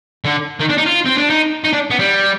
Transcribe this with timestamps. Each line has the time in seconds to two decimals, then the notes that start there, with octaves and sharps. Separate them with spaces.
0.25 D3
0.60 D#3
0.69 D4
0.77 D#4
0.86 F4
1.05 C4
1.18 D4
1.30 D#4
1.64 D#4
1.73 D4
1.91 B3
1.99 G3